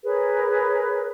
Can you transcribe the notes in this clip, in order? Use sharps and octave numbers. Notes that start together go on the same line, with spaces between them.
G#4 A#4 B4 C#5